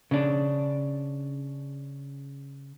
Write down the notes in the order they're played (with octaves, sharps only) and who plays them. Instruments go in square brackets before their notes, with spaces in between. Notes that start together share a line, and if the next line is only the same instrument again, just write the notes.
[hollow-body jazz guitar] C#3 D4